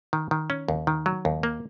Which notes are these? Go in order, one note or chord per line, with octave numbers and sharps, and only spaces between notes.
D#3
D#3
C#4
D#2
D#3
F#3
D#2
A#3